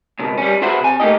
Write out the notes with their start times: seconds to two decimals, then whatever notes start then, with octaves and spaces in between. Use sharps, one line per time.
0.19 C#2 G#2 B2
0.38 G3 C#4
0.62 F#4 G#4 B4 C5 E5 F#5
0.80 C3 G#5
1.00 A3 A#3 D4 D#4 G4 D#5